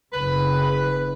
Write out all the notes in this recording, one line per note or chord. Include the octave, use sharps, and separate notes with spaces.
F#1 C#3 B4